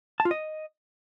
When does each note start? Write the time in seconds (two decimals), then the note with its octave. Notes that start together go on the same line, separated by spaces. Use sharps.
0.20 A5
0.25 F4
0.31 D#5